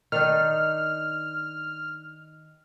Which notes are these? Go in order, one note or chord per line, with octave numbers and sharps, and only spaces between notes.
D#3 D4 D#4 F6